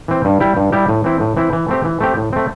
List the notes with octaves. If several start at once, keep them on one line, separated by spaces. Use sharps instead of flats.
E3 C4
G2
G3 E4 G4
G2
G3 E4 G4
A2
E3 C4 E4
A2
E3 C4 E4
E3
A3 C4 G4
E3
A3 C4 G4
A2
A3 C4